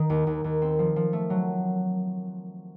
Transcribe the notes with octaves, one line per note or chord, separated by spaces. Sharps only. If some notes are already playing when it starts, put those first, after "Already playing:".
Already playing: D#3
D#2
D#2
D#2
C4
F3
F3
A3
F#3